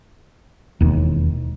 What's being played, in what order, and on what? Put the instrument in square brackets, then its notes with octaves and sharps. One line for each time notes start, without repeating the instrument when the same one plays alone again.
[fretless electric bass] E1 D#2